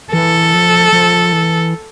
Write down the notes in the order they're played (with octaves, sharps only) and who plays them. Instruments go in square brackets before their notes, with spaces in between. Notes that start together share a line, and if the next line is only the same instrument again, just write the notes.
[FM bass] E3 [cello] A4
[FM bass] F3
F3
E3